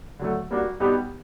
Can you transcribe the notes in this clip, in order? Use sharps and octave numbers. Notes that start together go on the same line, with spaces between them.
D3 F#3 A3
G3 A#3 D4 F#4
B2 G3 B3 D#4 G4